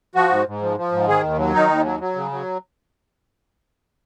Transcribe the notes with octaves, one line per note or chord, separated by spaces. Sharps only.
F3 F#4
G#2
G#2
F3
F3
G#2
D#3 G#4
D#2
F#3
D#3 D#4
D#2
F#3
F#3
C#3
F#3